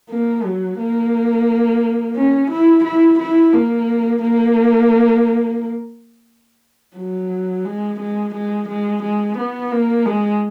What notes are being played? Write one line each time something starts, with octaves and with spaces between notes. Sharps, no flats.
A#3
F#3
A#3
C#4
E4
E4
E4
A#3
A#3
F#3
G#3
G#3
G#3
G#3
G#3
B3
A#3
G#3